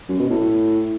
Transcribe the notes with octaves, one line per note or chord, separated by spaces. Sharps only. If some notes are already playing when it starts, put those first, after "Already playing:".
F#2
B2
A2